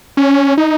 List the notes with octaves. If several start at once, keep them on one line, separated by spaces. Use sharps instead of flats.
C#4
D#4